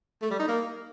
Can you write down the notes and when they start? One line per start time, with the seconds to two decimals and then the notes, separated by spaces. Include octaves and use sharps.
0.22 A3
0.31 G3
0.39 D#4
0.48 A#3